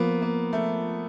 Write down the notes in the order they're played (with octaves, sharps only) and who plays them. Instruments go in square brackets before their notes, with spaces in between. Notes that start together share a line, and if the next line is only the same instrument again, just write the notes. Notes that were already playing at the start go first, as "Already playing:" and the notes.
Already playing: [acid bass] F3 [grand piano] A#3 B3
[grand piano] A#3
A3